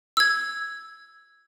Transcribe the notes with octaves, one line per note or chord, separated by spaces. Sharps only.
E6 G#6